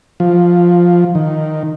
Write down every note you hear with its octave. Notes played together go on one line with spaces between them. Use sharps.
F3
D#3